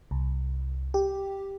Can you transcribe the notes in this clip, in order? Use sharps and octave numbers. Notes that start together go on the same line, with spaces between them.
C2
G4